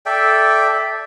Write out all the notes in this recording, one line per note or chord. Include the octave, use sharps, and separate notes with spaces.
A4 D5 E5 G5